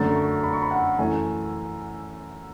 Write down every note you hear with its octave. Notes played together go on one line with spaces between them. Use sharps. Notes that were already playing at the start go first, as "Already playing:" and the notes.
Already playing: F#2 D3 A3 A6
C#6
B5
C#6
B5
F#5
F#2 E3 A3 G#5